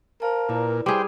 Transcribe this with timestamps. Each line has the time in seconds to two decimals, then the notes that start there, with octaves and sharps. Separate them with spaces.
0.22 A#4 C5 F5 A5
0.49 A#2 E4 B4 D5
0.86 G3 G#4 C5 G5